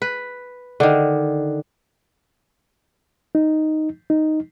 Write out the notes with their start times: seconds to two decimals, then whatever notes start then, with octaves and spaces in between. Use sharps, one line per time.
0.02 B4
0.80 D3 D#3
3.35 D#4
4.10 D#4